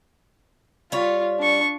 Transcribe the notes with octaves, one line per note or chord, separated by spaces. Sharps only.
G3 F4 C#5
D4 C#6